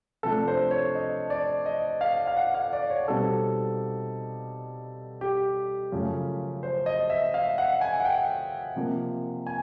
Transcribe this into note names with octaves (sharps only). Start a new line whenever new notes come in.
C3 F3 A3 D4 A4
C5
C#5
D#5
D5
D#5
F5
F5
F#5
F5
D5
C#5
B2 G3 C4 D#4 A4
G4
F#2 C#3 F3 A3
C5
D#5
E5
F5
F#5
G#5
F#5
G5
C3 F3 A#3
G#5